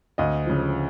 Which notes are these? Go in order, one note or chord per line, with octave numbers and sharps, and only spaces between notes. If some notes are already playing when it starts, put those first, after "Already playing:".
D2 D#5 F5
C#3 F3